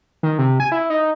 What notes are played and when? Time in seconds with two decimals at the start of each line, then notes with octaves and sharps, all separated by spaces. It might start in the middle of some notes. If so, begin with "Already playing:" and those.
0.23 D#3
0.39 C3
0.60 G#5
0.72 E4
0.90 D#4